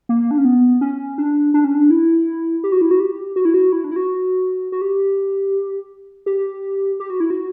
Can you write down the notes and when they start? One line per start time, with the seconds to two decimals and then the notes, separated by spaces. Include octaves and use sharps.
0.09 A#3
0.31 D4
0.38 C#4
0.45 B3
0.81 C#4
1.18 D4
1.54 D4
1.64 C#4
1.74 D4
1.90 E4
2.64 G4
2.72 F#4
2.81 E4
2.91 F#4
3.00 G4
3.36 F#4
3.45 E4
3.54 F#4
3.72 E4
3.84 D4
3.91 E4
3.96 F#4
4.72 F#4
4.81 G4
6.26 G4
7.00 G4
7.10 F#4
7.20 E4
7.30 F#4